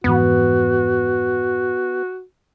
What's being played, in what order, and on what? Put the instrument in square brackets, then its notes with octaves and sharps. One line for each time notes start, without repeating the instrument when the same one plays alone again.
[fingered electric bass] F2 G#2 E3 [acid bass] B3 [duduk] F#4